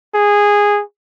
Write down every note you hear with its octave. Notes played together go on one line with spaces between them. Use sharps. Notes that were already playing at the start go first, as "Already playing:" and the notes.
G#4